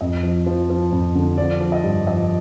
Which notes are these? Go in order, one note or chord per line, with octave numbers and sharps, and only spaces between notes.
F2 D#5
F3
F3
F3
F2
D3
F3 D5
F3
D#5
G2
F3 D#5